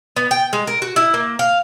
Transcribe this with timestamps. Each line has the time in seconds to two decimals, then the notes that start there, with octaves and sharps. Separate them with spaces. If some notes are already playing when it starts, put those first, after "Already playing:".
0.16 B3
0.31 G5
0.53 G#3
0.67 A#4
0.82 F#4
0.96 E4
1.14 A#3
1.39 F5